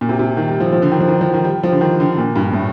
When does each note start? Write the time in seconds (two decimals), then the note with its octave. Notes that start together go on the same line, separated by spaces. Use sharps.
0.01 A#2
0.09 C3
0.19 C3
0.37 D#3
0.49 G3
0.60 F3
0.72 F3
0.82 D3
0.92 D#3
1.00 F3
1.08 D#3
1.21 F3
1.34 D#3
1.45 G3
1.63 F3
1.72 D3
1.81 D#3
2.00 D3
2.18 A#2
2.36 G2
2.53 A2